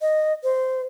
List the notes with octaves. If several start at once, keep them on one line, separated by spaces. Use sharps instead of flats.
D#5
C5